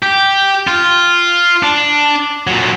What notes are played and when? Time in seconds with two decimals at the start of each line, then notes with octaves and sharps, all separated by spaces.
0.03 G4
0.67 F4
1.63 D4
2.47 A#2 F#3